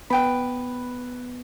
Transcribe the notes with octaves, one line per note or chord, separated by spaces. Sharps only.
B3 B4 G5 B5